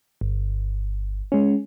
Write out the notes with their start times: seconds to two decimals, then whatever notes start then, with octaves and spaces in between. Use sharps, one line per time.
0.21 G1
1.32 G#3 C#4